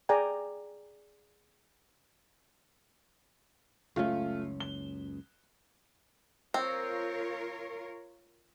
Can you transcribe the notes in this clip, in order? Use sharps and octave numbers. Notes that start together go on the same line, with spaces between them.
G#4 D5 G5 G#5 A#5
F#1 C#2 A3 C#4 F4
G7
C4 F4 A#4 C#5